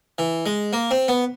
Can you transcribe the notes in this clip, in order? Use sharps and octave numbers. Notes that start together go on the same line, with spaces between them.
E3
G#3
A#3
C4
B3